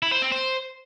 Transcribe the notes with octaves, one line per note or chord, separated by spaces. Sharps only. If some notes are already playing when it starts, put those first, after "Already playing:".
E4
C5
C4
C5